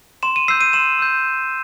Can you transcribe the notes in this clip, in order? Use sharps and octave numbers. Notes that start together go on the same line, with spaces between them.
C6 E7
D#7
E6 G6 C7
D#7
C6 E7
E6 G6